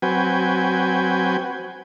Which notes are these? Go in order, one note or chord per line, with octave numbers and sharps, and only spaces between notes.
F#3 C4 F#4 B4 G5 G#5